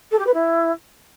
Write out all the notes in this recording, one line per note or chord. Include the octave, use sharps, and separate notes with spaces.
A4
G4
B4
E4